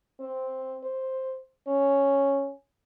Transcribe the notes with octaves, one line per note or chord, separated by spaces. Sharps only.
C4
C5
C#4